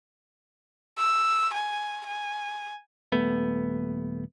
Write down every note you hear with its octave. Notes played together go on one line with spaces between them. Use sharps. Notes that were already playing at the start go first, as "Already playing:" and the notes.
E6
G#5
G#5
D#1 A3 B3